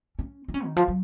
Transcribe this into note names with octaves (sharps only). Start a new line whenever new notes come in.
C#4
D#4
C#4
D#3
F3
F#3